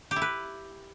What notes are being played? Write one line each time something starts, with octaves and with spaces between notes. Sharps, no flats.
G4
E4
B4